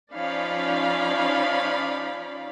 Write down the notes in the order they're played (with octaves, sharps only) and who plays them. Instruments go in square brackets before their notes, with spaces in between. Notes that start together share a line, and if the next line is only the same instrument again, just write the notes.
[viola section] F3 C#4 D#4 D5 F5 B5